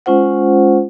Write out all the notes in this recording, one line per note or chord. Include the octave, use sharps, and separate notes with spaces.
G#3 C#4 F4 C5 F#5